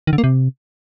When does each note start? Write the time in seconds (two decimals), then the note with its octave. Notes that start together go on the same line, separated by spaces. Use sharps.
0.07 D#3
0.13 D3
0.18 A#3
0.24 C3